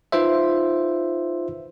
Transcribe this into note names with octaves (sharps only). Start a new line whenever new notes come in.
D#4 F4 B4 C5 E5